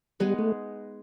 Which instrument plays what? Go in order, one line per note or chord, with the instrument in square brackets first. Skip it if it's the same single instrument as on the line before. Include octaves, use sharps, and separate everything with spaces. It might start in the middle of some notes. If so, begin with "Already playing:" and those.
[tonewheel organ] G3 [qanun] G#3 B3 D#4 G#4
[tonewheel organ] A3